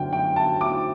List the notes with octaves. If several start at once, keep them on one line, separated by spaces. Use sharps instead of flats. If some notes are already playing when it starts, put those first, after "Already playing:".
Already playing: F#2 D3 G5
G5
A5
D6